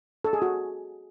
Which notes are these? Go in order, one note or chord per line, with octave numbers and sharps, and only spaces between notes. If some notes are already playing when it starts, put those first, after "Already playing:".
A4
G#4
F#4